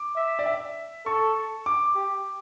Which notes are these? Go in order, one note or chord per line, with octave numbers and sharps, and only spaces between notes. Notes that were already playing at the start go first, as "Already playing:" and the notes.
Already playing: D6
E5
D5
E5
A4 C#6
D6
G4